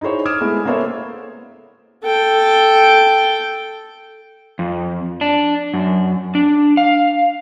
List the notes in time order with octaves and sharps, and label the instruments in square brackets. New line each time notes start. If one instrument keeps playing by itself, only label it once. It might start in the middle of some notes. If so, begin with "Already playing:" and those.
[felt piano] D#4 E4 G#4 C5 C#5
D6 D#6 F6 G#6 D7 E7
G#3 A3 B3 E4
A#3 B3 A4 C5 C#5 E5
[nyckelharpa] A4 G5
[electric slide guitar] F2
D4
F#2
D4
F5